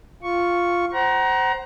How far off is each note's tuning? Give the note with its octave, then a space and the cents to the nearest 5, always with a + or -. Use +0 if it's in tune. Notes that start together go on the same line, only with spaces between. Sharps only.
F4 +0 C#6 +0
C5 +0 F#5 +35 A#5 +25